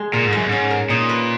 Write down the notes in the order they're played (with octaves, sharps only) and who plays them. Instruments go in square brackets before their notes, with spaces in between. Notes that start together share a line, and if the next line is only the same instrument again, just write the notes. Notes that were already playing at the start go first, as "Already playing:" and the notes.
Already playing: [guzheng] G#3
[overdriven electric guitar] A#2 [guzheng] A#4
[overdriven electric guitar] G#2
[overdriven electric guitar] F#2 [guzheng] G#3
[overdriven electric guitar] G#2 [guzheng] C#4
[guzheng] A#4
[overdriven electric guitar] A#2 [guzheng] D#4
[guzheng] B4